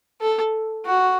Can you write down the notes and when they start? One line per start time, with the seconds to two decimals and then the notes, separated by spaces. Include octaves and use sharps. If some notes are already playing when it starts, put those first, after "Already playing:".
0.21 A4
0.86 F#4